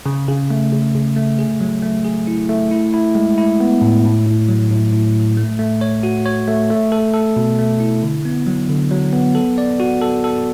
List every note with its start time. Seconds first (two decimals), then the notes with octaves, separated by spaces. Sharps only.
0.06 C#3
0.28 C#3
0.50 A3
0.72 C#3
0.94 C#3
1.17 A3
1.39 G#4
1.61 F#3
1.82 A3
2.05 G#4
2.27 E4
2.49 A3
2.71 E4
2.94 E4
3.15 G#3
3.38 E4
3.60 B3
3.81 A2
4.05 A2
4.26 A2
4.49 F#3
4.71 A2
4.92 A2
5.15 A2
5.37 A3
5.59 A3
5.81 C#5
6.03 F#4
6.26 C#5
6.48 A3
6.70 A3
6.92 A4
7.14 A4
7.36 B2
7.58 A3
7.80 E4
8.03 D3
8.25 B3
8.47 F#3
8.69 D3
8.91 F#3
9.13 B3
9.35 A4
9.58 D5
9.80 F#4
10.01 A4
10.24 A4